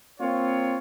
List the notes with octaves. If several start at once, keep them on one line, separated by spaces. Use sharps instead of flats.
A#3 C4 F4 C#5